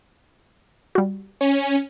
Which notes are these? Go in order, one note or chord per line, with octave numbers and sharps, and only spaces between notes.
G3 F#4
C#4